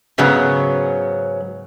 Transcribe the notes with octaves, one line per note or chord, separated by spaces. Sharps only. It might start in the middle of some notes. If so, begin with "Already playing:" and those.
G#2 C#3 F#3 B3